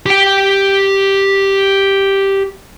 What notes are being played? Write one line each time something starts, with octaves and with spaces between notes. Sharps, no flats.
G4 G5